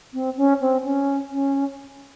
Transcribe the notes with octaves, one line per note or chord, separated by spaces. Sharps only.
C4
C#4
C4
C#4
C#4